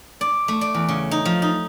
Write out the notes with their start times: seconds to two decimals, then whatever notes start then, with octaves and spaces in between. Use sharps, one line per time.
0.21 D5
0.48 A3
0.61 D5
0.75 E2
0.89 C#3
1.11 D#4
1.25 F3
1.42 D#4